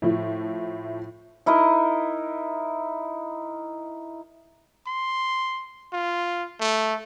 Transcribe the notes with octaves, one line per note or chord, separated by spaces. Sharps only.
A2 F3 E4
D#4 E4 A#4 D#5
C6
F4
A3